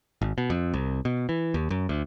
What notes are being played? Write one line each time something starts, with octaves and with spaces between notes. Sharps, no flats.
G#1
B2
F2
C2
B2
E3
D#2
F#2
D2